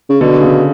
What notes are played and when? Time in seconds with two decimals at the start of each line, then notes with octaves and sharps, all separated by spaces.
0.10 C#3
0.21 B2 D3
0.41 C#3